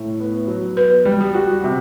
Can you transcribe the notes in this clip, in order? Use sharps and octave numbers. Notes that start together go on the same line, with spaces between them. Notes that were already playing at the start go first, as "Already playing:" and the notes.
Already playing: A2
B3
F#3
B3 B4
G3
G4
F#4
C3